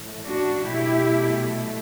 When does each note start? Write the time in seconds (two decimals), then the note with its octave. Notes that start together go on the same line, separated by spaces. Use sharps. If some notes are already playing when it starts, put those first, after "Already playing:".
Already playing: A2 E3 A3
0.25 D4 F#4
0.62 B2 F#3 A3 E4 G4